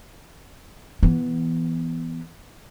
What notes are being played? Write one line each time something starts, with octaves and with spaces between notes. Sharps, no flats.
E3 B3